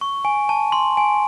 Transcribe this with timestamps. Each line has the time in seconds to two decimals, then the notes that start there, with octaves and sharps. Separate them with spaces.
0.01 C#6
0.25 G#5
0.49 A5
0.72 C6
0.97 G#5